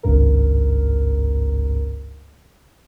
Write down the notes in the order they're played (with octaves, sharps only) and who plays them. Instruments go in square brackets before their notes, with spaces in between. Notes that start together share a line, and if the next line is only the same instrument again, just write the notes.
[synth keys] G#1 C#2 G2 A#4